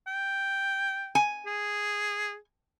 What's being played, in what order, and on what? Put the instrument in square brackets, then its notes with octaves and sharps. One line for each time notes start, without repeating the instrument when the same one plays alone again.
[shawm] G5
[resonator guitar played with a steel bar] G#5
[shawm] G#4